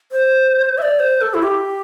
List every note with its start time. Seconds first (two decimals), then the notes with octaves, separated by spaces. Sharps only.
0.12 C5
0.78 E5
0.82 D5
0.99 C5
1.21 A4
1.34 E4
1.43 G4